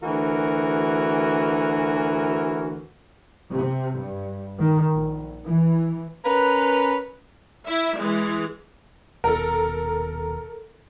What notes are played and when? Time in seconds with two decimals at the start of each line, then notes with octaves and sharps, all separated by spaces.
0.02 D2 E3 F#4 A#4
3.51 C3
3.98 G2
4.59 D#3
4.94 A#1
5.45 E3
6.25 C#4 A#4 B4
7.65 E4 E5
7.97 E3 G#3
9.24 D#1 B2 A4 A#4